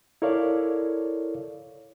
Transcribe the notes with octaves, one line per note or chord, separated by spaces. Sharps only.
E4 A4 A#4 C#5 D5 F5